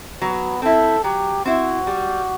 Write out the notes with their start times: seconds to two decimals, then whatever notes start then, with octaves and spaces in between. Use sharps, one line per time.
0.21 F#3 B3
0.62 C4 E4 A4
1.04 F#3 G4
1.45 C4 E4 F#4
1.87 G3